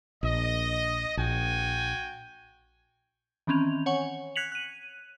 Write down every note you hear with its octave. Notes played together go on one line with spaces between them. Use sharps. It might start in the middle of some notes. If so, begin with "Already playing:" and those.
A#1 D#5
A#1 F#4 G5 G#5
D#3 E3 C4 C#4 F7
C#5 F#5 G#5 C#6
F#6 G#6 B6 C#7 F7 F#7
F#6 D#7